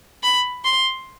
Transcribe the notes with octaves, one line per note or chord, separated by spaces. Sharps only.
B5
C6